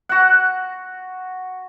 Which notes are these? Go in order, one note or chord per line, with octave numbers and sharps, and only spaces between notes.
F#4 F#5